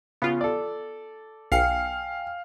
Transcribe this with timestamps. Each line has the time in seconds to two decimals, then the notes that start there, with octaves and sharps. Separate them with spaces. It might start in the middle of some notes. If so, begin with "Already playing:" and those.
0.22 C#3 B3 F4
0.41 A4 D5
1.52 B1 F5 G5 G#5 F6 C7 C#7